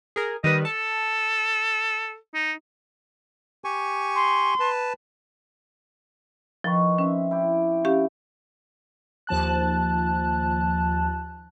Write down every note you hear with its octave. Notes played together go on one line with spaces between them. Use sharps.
G#4 A#4
D#3 G3 B4 D#5
A4 A5
D#4
G4 G#5 C#6
C6
B4 A5
D#3 F3 B4 C#6
C4 C#4 E5
E4 G5 D6
C#4 G4 F5
D#2 F3 A5 F#6